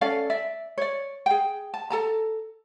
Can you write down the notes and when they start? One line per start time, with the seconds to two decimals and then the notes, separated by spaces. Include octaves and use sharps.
0.01 C#4 A4 D5 F5
0.30 D5 E5
0.78 C#5 D5
1.26 G#4 G5
1.74 A5
1.90 A4 A5 A#5